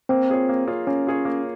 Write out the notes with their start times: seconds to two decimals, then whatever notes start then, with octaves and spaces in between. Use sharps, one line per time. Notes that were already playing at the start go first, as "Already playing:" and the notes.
0.09 A#3 C4
0.30 F4 G#4 C#5
0.49 A#3
0.67 F4 G#4 C#5
0.87 A#3 C#4
1.07 F4 G#4 C#5
1.25 A#3